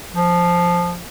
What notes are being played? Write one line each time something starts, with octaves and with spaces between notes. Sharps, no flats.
F3